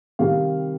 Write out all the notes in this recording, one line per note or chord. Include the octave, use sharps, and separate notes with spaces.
C3 D#3 G3 F5